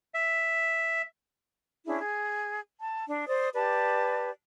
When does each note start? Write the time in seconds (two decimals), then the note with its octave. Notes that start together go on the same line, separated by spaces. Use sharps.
0.14 E5
1.86 C#4 D4 E4 G#4
2.00 G#4
2.80 A5
3.08 D4
3.27 C5 D5 D#6
3.54 G4 B4 D5 A5